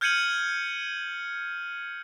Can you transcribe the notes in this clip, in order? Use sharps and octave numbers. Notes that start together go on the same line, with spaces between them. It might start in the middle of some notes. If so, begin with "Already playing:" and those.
F6 G6 G#6 C#7 D#7 F#7